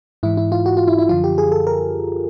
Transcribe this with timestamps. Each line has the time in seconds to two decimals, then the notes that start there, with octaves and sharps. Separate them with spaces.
0.23 G#2 E3 E4
0.37 E4
0.52 F4
0.66 F#4
0.77 F4
0.88 E4
0.99 E4
1.09 F#2 D3 F3 F4
1.24 G4
1.38 G#4
1.52 A4
1.67 A#4